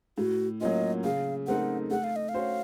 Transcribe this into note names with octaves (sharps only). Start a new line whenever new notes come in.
A2 F#4
F#3 A#3 C#4 F4 D#5
C#3 F5
A3 C4 D#4 A#4 F#5
A3 F#5
F5
D#5
F5
C#4 F#4 C5